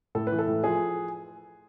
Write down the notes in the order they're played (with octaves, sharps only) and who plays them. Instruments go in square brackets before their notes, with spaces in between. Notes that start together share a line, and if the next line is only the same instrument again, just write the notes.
[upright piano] A2 [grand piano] A4
[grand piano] B4
[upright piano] E3
[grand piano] A4
[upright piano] A2
[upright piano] F3 [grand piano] G#4